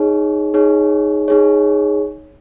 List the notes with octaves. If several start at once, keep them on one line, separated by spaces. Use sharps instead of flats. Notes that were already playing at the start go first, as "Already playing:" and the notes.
Already playing: D#4 G#4 C#5
D#4 G#4 C#5
D#4 G#4 C#5